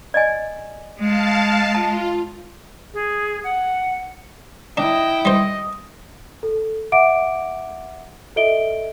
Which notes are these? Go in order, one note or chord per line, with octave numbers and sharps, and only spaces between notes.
D5 D#5 G#5
G#3 F5 A5
F4 A5
G#4
F#5
D4 E4 D#5 G5
G3 C5 D#5
A4
E5 F#5 D6 D7
A4 D#5 E5 D7 G7